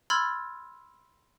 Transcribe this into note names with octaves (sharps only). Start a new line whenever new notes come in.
B5 C6 E6 F6 G#6 A6